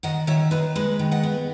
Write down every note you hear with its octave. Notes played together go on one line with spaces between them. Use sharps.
D#3 D#5 F#5
D#3 C#5 E5
D#3 B4 D#5
G#3 B4 D#5
D#3
D#5 F#5
B3